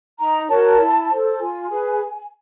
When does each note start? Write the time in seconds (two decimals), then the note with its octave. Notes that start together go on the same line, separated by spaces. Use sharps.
0.19 D#4 A#5
0.49 F#4 A#4 C#5 A5
0.80 E4
1.10 A4 C5
1.40 F4 G#5
1.70 G#4 B4